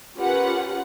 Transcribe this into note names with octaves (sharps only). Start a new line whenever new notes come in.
C#4 F4 G4 A#4 B4 F#5